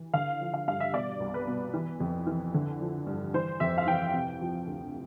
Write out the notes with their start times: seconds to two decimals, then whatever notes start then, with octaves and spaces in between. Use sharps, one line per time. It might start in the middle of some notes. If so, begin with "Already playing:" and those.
Already playing: E3
0.13 D3 F5
0.41 F3
0.54 F5
0.67 G2 F5
0.80 E5
0.94 B2 D5
1.20 C2
1.34 B4
1.47 B2
1.74 E3
2.00 F2
2.27 E3
2.54 D3
2.81 F3
3.06 G2
3.34 E3 C5
3.60 F2 E5
3.78 F5
3.87 E3 G5
4.13 C3
4.41 F3
4.67 D2